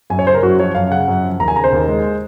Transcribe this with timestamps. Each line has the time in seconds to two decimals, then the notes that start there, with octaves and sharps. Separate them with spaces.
0.10 F#2 G#5
0.19 C#5
0.26 C#3 C5
0.35 A#4
0.43 F#2 F#4
0.59 F3 C#5
0.75 F#2 F5
0.91 C#3 F#5
1.08 F#2
1.24 F3
1.40 D#2 A#5
1.48 G#5
1.56 C#3 A#5
1.64 C5
1.72 D#2
1.88 G#3